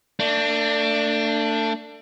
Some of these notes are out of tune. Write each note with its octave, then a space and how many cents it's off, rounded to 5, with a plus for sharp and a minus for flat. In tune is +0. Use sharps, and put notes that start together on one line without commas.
A3 +40 D4 +5